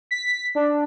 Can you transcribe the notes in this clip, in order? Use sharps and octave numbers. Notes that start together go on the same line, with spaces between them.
B6
D4